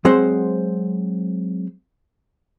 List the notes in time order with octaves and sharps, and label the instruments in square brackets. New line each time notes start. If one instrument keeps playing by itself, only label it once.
[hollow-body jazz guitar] F#3 G#3 C4 C5 F#5